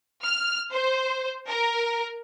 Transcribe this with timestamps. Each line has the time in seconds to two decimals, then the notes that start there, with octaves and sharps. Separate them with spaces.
0.23 F6
0.71 C5
1.47 A#4